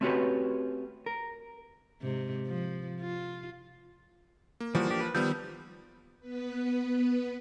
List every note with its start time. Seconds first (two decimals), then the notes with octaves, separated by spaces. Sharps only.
0.01 A3 C4 C#4 F#4 G4 B4
1.06 A#4
2.02 G#2 C3
2.46 F3
3.00 F4
4.60 A#3
4.75 E3 F3 G3 A#3 F#4
4.87 D4 G4
5.01 B4
5.15 D#3 F3 G3 B3 E6 G6
6.20 B3 B4